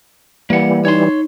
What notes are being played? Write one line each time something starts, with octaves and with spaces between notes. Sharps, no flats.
E3 G3 A#3 F#5
D#4 C#5 C6